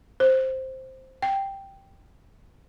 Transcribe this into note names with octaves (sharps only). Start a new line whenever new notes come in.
C5
G5